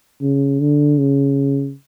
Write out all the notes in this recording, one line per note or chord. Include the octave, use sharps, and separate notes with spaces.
C#3
D3
C#3